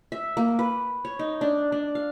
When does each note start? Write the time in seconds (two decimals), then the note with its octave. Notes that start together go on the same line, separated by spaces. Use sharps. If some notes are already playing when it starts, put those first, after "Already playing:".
0.12 E5
0.37 A#3
0.59 B4
1.05 C#5
1.19 D#4
1.41 D4
1.72 D4
1.95 F5